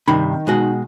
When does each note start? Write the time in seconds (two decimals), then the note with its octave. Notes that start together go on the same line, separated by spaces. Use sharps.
0.08 G2 C3 D#3 B5
0.47 B2 G#3 F#4